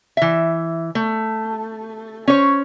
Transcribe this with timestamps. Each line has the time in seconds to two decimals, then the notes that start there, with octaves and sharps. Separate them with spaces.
0.17 E3 E5
0.95 A3
2.28 C#4 C5 C#5